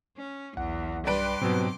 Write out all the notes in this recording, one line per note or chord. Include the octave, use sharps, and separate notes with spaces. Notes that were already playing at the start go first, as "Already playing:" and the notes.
C#4
B1 E2 F#5
G2 B4 D5 G5 C6 D6 D7
G#2 B2 F#3 C4